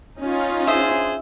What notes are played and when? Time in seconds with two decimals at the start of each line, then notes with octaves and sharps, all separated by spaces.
0.18 C#4 D#4 F4
0.67 D4 G#4 C5 E5 D#6